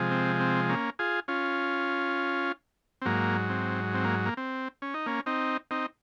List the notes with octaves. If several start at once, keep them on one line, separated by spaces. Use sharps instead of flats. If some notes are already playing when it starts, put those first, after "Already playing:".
Already playing: C3 F3 G#3
C4
C4
A#3 C#4
F4 G#4
C#4 F4
C4
G#2 F#3 A#3
C4
C4
A#3
A#3
C4
C#4
D#4
A#3 C#4
C4 D#4
C4 D#4